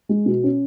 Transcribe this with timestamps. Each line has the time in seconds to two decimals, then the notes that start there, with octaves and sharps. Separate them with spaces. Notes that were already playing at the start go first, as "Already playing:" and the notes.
0.09 G#3
0.26 B2
0.43 C#4